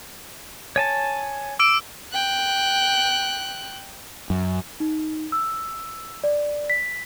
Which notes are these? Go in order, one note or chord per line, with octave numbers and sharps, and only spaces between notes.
C#5 G#5 A5
D6 E6 D7
G5 F#6
F#2
D#4
E6
D5
B6